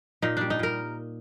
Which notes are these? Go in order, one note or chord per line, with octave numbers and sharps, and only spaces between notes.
A#2 D#4
G3 D4
D#4
A#2 A#4